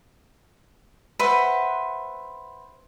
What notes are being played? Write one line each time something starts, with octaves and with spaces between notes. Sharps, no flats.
B4 C5 E5 F#5